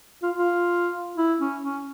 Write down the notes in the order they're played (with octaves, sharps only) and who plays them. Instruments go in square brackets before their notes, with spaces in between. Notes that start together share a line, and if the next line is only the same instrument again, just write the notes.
[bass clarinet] F4
F4
E4
C#4
C#4